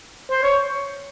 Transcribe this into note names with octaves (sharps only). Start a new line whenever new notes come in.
C5
C#5